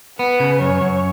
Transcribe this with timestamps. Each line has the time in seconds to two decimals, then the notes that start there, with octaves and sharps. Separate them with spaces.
0.19 B3 B4
0.40 C#3
0.60 F#2 C#5
0.81 F#2